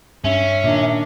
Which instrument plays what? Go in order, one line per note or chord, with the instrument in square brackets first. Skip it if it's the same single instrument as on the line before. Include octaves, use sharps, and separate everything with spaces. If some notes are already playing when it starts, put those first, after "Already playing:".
[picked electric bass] G2 [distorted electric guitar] C#4 [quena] E5
[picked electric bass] A#2 [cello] D#3 D4